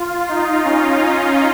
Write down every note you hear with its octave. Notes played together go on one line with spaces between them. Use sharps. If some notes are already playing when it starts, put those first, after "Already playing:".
Already playing: F4
D#4
C#4